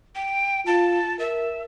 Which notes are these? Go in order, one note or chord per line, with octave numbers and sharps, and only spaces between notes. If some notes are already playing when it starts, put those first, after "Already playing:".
G5
F4 A5
A#4 E5